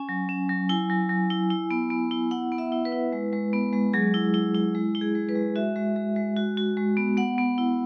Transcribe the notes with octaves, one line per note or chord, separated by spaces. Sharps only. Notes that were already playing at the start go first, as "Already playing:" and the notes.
Already playing: C#4 G#5
F#3
C#4
F#3
E4 G#5
F#3
F#3
E4
E4
B3
B3
E4
E4 F#5
B3
E5
E4
B4
E4
G#3
G#3
B3
G#3
F#3 G#4
E4
E4
E4
G#3
E4
G#4
G#3
B4
G#3
F#4 E5
G#3
G#3
G#3
F#4
F#4
G#3
B3
B3 F#5
B3
E4